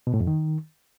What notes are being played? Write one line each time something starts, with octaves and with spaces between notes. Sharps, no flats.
B2
A2
F2
D#3